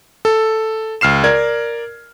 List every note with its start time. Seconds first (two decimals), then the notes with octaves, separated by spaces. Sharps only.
0.25 A4
1.01 C#2 F6 C7 E7
1.24 A#4 D5 G#6